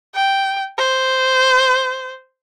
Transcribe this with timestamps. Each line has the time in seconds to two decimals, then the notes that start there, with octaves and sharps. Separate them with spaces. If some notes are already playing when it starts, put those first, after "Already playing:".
0.15 G5
0.78 C5